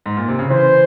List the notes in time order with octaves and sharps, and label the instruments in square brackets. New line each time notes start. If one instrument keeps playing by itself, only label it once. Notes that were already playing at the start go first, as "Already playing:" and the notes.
[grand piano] G#2
A#2
C3
C#3
[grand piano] E3 [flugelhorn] C5